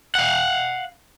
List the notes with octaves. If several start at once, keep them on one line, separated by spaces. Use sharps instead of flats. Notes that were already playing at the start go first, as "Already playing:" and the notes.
F5 F#5